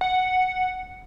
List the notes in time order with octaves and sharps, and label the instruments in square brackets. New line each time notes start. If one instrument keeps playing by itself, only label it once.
[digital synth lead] F#5